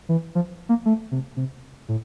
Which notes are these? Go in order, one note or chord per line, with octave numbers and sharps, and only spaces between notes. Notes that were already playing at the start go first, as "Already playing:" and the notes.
E3
F3
A#3
A3
C3
C3
A2